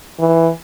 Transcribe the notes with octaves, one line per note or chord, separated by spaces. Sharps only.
E3